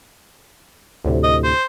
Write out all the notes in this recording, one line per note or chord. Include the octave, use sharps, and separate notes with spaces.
D2 A2 C3
D#5
C5